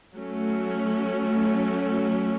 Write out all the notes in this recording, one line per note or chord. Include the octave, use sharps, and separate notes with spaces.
F#3 A3 C#4